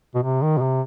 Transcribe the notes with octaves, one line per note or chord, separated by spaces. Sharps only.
B2
C3
D#3
B2
C3